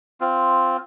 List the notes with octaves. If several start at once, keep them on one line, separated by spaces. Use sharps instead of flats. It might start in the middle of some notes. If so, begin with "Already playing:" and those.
C4 F4